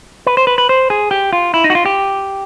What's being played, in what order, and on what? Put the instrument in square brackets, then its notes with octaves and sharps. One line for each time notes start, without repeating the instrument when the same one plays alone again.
[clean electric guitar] B4
C5
B4
B4
C5
G#4
G4
F4
E4
D#4
F#4
F4
G4